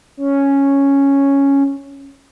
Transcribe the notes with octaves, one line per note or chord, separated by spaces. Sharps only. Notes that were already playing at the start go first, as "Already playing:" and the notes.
C#4